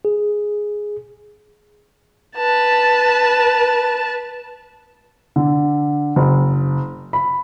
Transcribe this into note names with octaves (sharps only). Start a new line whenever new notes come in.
G#4
B4 A5
D3
F#1
B5